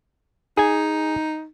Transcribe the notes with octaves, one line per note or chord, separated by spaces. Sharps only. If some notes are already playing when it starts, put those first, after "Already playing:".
D#4 G#4 G#5